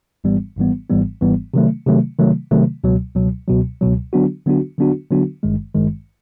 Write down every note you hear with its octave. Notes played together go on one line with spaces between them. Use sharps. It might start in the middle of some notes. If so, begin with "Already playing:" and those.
G#1 G#2 E3 G3 B3
G#1 G#2 E3 G3 B3
G#1 G#2 E3 G3 B3
G#1 G#2 E3 G3 B3
C3 D#3 F#3 A3
C3 D#3 F#3 A3
C3 D#3 F#3 A3
C3 D#3 F#3 A3
C#2 B2 F#3
C#2 B2 F#3
C#2 B2 F#3
C#2 B2 F#3
D3 F#3 B3 D4 F#4
D3 F#3 B3 D4 F#4
D3 F#3 B3 D4 F#4
D3 F#3 B3 D4 F#4
G#1 G2 D#3 G#3
G#1 G2 D#3 G#3